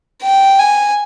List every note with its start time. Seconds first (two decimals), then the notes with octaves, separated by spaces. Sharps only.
0.22 G5
0.59 G#5